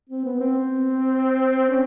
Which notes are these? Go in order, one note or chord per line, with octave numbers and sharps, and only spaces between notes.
C4
B3
C4
C#4